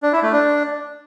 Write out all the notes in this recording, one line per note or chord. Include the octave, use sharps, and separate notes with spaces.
D4
E4
A3
D4